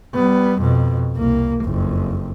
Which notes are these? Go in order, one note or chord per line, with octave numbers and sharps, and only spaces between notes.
G3 B3
F2 B2
C2 A#3
F#1 F2